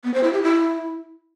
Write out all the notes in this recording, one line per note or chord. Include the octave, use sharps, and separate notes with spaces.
B3
C5
E4
G4
E4